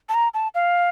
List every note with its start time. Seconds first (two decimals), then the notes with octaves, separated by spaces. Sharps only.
0.09 A5
0.14 A#5
0.34 A5
0.54 F5